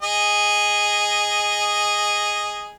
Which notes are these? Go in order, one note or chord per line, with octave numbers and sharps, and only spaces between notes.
G#4 D#5